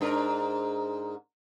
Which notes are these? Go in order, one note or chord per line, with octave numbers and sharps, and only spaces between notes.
G#2 D4 A#4